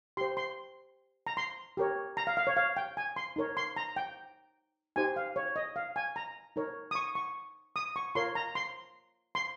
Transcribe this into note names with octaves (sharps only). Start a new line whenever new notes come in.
G4 C5 C6
C6
A#5
C6
G4 A#4 C#5
A#5
F5
F5
C#5
F5
G5
G#5
C6
D#4 A#4 C#5
C6
A#5
G5
D#4 G4 C5 G#5
F5
C#5
D#5
F5
G#5
A#5
D#4 A#4 C#5
D#6
C#6
C#6
D#6
C#6
F4 A#4 C#5 C6
A#5
C6
C6